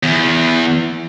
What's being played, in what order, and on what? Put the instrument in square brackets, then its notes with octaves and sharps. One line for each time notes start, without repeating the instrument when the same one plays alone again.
[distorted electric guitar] E2